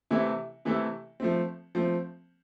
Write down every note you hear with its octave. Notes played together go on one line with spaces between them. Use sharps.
C3 E3 A3 E4
C3 E3 A3 E4
F3 A3 C4
F3 A3 C4